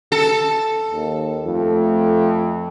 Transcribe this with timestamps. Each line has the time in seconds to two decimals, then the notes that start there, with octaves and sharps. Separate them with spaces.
0.12 A4
0.92 D#2
1.47 F2 A3